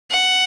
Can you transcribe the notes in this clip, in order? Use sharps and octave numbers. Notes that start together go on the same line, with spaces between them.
F#5